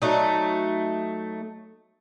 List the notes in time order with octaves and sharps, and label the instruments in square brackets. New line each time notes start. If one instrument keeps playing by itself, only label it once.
[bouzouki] F#3 A3 D#4